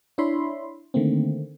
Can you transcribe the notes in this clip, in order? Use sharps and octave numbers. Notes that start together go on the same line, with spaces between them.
D4 E4 C#5 E5 B5 C6
D3 D#3 A3 A#3 C4